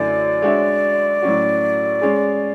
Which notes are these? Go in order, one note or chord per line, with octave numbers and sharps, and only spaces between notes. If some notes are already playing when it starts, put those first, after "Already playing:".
Already playing: F#2 D3 A3 E4 D5
G#3 D4 F#4 C#5 E5
A2 F#3 C#4 F#4
G#3 C#4 G#4